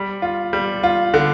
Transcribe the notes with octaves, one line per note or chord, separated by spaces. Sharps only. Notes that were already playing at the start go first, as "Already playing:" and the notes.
Already playing: G3
F4
G3
F4
D3